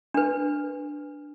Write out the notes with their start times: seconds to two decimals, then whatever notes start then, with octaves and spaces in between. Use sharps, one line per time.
0.14 D4 B4